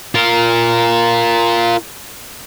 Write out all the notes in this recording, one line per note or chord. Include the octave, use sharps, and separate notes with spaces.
F4 A#4